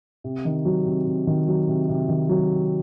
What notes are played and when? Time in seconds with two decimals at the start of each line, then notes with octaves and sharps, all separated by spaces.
0.24 C3
0.45 D#3
0.65 F#3
0.86 C3
1.07 C3
1.27 D#3
1.48 F#3
1.68 C3
1.89 C3
2.08 D#3
2.29 F#3